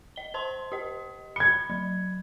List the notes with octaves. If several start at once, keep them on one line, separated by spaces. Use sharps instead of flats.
D#5 G7
C5 A5 C6
G4 D#5
B5 G#6 C#7
F#3